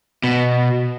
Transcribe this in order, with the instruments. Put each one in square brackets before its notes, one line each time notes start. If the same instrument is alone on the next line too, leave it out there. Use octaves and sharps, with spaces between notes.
[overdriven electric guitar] B2